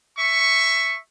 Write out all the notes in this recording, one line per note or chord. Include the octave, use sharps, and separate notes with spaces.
E5 C#6